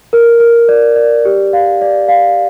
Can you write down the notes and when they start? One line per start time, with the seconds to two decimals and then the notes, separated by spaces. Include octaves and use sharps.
0.13 A#4
0.40 A#4
0.69 D5
0.96 D5
1.25 G4
1.53 F5
1.82 D5
2.08 F5